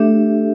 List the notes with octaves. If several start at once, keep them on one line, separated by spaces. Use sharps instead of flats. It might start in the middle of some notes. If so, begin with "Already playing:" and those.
Already playing: A3 D4 G4 E5